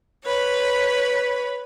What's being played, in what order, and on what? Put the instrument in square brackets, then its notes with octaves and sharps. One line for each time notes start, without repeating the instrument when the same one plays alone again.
[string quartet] B4 C#5 B5